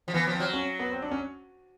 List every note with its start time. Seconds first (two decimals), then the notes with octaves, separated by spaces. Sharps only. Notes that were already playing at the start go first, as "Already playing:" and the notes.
0.08 F3
0.14 E3 B3
0.27 F3
0.33 C4
0.40 F#3
0.53 C#4
0.79 B3
0.92 C4
1.02 D4
1.11 C#4